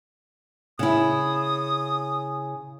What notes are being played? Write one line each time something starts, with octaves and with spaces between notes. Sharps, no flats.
C#3 E4 D#6